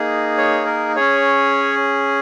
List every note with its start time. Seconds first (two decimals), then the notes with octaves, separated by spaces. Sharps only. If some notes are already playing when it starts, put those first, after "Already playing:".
Already playing: A#3 D#4 G#4
0.38 C#5
0.66 A#4
0.96 C#4 G#4 C#5